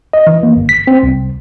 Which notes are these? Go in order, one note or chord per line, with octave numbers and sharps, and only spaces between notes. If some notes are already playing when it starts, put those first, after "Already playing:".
D#5
E3
A#3
G1
B6
C4
C2